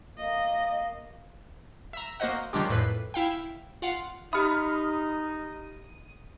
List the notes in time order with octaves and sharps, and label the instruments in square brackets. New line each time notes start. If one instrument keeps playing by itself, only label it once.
[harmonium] A#3 [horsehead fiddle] D#5
[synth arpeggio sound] E5 A#5
A#3 F#4 C5 D#5 F#5
D#3 F#3 G#3 D4 F4 G4
F2 A2 B4 C7
E4 F5 G5
F4 F5 F#5
[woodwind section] D#4 [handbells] G4 E5 [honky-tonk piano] B5 F6 [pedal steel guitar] D#6